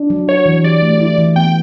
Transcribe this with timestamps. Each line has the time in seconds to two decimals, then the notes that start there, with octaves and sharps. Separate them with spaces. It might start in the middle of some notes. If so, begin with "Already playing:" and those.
Already playing: D4
0.10 F#3
0.28 F#4 C#5
0.46 E3
0.64 G4 D5
0.82 A3
1.00 E4
1.18 E3
1.36 B3 G5